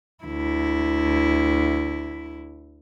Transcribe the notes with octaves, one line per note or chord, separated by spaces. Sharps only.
D2 E4